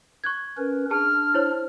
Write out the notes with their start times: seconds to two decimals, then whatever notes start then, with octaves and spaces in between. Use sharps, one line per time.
0.24 C#6 F#6 G#6
0.57 C#4 A#4 B4
0.91 D4 G#4 A5 F6
1.34 E4 C5 C#5